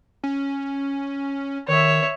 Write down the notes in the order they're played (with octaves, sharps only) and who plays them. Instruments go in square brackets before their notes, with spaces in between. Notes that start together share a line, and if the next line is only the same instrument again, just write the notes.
[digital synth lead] C#4
[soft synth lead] D#3 [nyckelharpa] C#5 E5